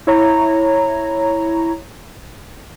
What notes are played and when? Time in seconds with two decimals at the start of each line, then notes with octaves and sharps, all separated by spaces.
0.07 E4 C#5 A#5